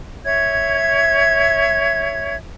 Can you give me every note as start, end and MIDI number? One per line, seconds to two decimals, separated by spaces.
0.25 2.36 73
0.25 2.36 76
0.25 2.36 92